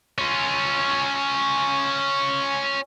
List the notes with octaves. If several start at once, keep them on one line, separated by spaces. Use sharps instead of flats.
C#4 F4